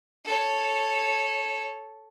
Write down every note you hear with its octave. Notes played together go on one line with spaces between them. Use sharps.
A4 C#5